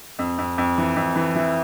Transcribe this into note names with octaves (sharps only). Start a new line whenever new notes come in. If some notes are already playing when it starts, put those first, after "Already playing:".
F2
F2
F2
E3
F2
E3
E3